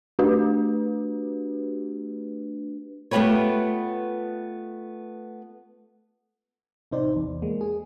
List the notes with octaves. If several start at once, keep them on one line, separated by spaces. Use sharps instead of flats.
A3 D4 F#4 G4 B4
A3 B3 F4 G4 B4 C#5
A1 C3 D#4 C5 D5
E2
G#3 A#3
G#4